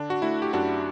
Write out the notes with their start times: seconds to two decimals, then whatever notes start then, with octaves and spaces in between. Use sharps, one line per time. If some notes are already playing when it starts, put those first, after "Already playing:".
Already playing: D3 D4
0.10 F#4
0.22 A3 E4
0.42 G4
0.53 F#2 D4 F#4